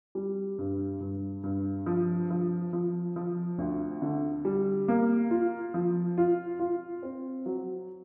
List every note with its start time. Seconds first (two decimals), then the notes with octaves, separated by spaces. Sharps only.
0.15 G3
0.58 G2
1.01 G2
1.44 G2
1.86 F3
2.30 F3
2.73 F3
3.16 F3
3.58 D2
4.02 D3
4.45 G3
4.88 A#3
5.31 F4
5.74 F3
6.18 F4
6.59 F4
7.03 C4
7.46 F#3